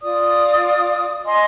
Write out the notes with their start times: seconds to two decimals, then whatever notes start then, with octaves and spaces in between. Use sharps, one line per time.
0.01 F4 D5 D#6
1.25 D#5 G#5 C6